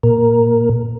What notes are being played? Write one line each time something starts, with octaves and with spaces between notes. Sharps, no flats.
A#2 A#4